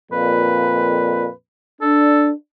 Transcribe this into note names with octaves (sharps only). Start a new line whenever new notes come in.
F2 A#2 B4
D4 A4